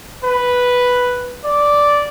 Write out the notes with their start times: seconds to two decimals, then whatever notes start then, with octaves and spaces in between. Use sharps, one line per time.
0.25 B4
1.45 D5